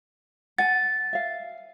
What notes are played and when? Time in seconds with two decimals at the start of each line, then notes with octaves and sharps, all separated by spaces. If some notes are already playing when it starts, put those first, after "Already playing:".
0.58 F#5 G#5 A6
1.13 E5 F5